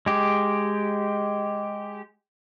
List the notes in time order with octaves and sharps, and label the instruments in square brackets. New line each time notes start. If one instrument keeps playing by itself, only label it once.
[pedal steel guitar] G#3 G4